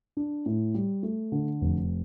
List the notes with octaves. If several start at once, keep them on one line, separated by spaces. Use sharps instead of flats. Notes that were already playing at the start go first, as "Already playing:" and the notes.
D4
A2
G3
A3
D3
F1